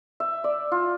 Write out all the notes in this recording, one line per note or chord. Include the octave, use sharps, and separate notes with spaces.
E5
D5
F4